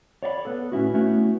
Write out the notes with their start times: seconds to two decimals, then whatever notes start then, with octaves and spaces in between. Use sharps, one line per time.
0.23 C#5 D5 E5 B5
0.45 B3 A4
0.72 A2 C#4 E4 F#4
0.94 A3 B3 C#4 E4 F#4